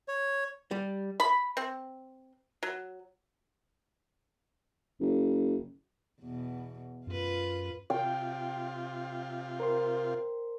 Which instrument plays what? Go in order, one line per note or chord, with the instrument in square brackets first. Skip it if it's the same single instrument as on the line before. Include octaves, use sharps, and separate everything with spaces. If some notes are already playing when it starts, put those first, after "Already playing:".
[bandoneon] C#5
[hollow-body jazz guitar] G3
[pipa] B5
C4
F#3
[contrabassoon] F#1
[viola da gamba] E2 B2
[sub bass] F#2 [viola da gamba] F4 B4
[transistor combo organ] C3 F4 [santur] G5
[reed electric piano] A#4 C5 C6